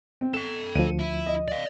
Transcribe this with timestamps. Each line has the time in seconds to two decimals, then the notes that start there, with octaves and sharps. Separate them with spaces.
0.21 C4
0.34 A4 G5 E7
0.75 D2 F3 D#7
0.99 E4
1.26 D#5
1.48 D5 F5